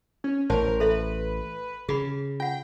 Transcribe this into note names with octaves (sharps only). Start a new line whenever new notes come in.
C#4
A1 A#4 C5 C#5 A5
A4 B4 E5
C#3 G#4 B5
F4 F#5 G5